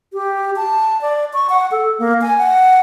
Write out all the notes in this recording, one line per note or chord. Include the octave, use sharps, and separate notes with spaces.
G4
A5
D5
C#6
F#5
A4
A#3
G#5
F#5